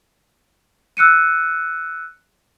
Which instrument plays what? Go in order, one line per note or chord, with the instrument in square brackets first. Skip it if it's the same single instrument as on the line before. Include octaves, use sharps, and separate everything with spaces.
[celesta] E6 F#6 C#7 D#7